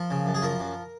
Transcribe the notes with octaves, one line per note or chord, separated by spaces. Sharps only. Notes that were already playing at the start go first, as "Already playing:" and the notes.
Already playing: F3 A#4
C#3
F#2
G#4
F3 A#4
F#2